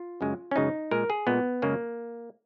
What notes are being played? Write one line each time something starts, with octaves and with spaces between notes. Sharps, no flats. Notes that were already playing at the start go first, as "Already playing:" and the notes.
Already playing: F4
F#2 C#3 G#3
C#4
F#2 C#3 G#3 D#4
A#2 G#3 A#4
G#4
A#2 G#3 B3
F#2 C#3 G#3 A#3